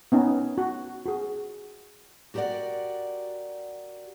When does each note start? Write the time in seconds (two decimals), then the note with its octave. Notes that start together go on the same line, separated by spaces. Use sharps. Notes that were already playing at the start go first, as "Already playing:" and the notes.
0.12 B3 C#4 D#4
0.58 F#4
1.05 F#4 G#4
2.34 F#4 G4 A#4 B4 D5 F#5